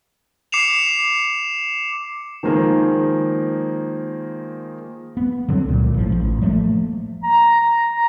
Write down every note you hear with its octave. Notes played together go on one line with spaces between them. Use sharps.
D6 C7 C#7 E7 F7
D#3 F3 G#3 A#3 G#4
B3
D3 F#3 G#3 C4
C#2 A#2
G#1 A2 F3
A1
F3 G3 A3 A#3
A#5